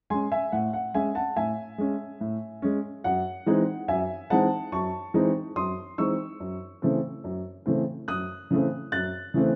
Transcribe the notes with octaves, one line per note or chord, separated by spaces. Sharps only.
G#3 C#4 G#5 C6
E5 G#5
A2 F#5
F#5
G#3 C#4 E5 G#5
F#5 A5
A2 E5 G#5
G#3 C#4
A2
G#3 C#4
F#2 F#5
E3 G#3 C4 D#4
F#2 E5 G#5
E3 G#3 C4 D#4 F#5 A5
F#2 A5 C#6
E3 G#3 C4 D#4
F#2 C6 D#6
E3 G#3 C4 D#4 C#6 E6
F#2
C#3 E3 A3 C4
F#2
C#3 E3 A3 C4
F#2 D#6 F#6
C#3 E3 A3 C4
F#2 F#6 A6
C#3 E3 A3 C4